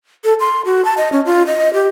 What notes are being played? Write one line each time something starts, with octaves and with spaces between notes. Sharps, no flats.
A4
C6
F#4
A5
D#5
C#4
F4
D#5
G4